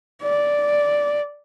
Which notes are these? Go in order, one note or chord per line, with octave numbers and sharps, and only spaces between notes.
D5